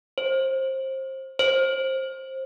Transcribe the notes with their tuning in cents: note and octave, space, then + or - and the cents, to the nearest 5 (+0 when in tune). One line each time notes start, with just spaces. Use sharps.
C5 +25
C5 +20